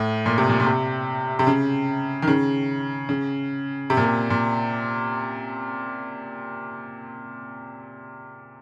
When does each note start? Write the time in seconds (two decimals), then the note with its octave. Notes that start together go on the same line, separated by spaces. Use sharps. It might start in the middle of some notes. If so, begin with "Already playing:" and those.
Already playing: A2
0.26 A#2
0.38 C3
0.49 A#2
0.60 A#2
0.66 C3
1.39 C3
1.47 C#3
2.22 D#3
2.28 C#3
3.09 C#3
3.90 C3
3.97 A#2
4.04 C3
4.30 A#2